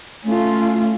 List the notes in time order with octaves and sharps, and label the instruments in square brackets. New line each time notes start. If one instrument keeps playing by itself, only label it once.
[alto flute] A3 [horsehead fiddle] C#4 F4